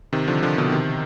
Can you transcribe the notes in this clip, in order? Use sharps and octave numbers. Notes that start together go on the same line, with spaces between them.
C3 D#3
D3 F3
D3 F3
B2 D3
C3 D#3